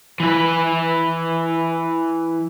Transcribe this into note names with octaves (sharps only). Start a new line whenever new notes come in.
E3 B4